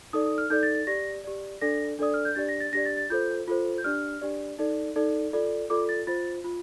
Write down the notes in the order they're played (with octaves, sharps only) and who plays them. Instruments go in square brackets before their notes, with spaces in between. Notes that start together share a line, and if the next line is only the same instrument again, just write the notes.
[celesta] D#4 A4 D5 D#6
D#6
F6
D#4 A4 D5 G6
A6
A6
G4 D5 A#6
G4 D5
D4 A4 D5 A#6
D4 A4 D5 D#6
F6
G6
D4 G4 D5 A6
A#6
A6
D4 G4 D5 A#6
A6
A6
F4 A4 C5 G6
F4 A4 C5
G6
D4 G4 D5 F6
D4 G4 D5
D#4 A4 D5
D#4 A4 D5
F4 A4 D5
F4 A4 D5 D6
A6
F4 C5 A6
F4